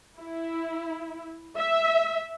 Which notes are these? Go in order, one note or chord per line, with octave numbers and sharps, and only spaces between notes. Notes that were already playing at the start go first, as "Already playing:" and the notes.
E4
E5